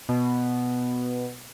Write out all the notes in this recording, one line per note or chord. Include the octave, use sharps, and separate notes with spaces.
B2